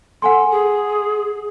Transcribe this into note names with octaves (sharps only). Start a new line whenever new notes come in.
A4 F#5 G#5 C6
G#4